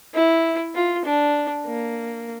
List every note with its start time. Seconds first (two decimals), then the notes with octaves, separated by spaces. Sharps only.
0.14 E4
0.74 F4
1.05 D4
1.66 A#3